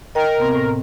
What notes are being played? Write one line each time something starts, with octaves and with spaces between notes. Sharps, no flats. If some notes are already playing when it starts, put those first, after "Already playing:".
A#4 D#5 G5
C3 B3 C4
A2